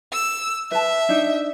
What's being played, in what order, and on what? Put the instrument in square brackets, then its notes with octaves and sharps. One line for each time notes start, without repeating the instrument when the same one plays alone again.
[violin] E6
[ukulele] B4 A5 [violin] E5
[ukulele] D4 D#4